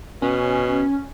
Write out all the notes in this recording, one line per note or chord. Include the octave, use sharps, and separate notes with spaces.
B2 C#4